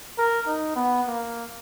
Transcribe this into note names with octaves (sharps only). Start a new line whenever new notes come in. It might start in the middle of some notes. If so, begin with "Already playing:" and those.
A#4
D#4
B3
A#3